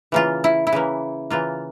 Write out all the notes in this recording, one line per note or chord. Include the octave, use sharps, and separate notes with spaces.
C#3 E3 A#3 F4
E4
E4
C#3 E3 A#3
C#3 E3 A#3 F4